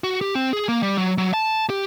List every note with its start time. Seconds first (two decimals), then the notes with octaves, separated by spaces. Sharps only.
0.04 F#4
0.21 G4
0.35 C4
0.53 G#4
0.69 A#3
0.83 G3
0.97 F#3
1.18 F#3
1.34 A5
1.70 G4